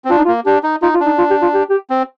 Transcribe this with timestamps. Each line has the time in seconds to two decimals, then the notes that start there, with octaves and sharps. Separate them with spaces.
0.05 C4
0.10 D4 F4
0.17 D#4
0.25 F4
0.28 A#3
0.46 D4 G4
0.63 D#4
0.82 D#4 F4
0.94 F4
1.00 D4
1.06 D#4
1.18 F4
1.30 G4
1.42 F4
1.54 G4
1.70 G4
1.90 C4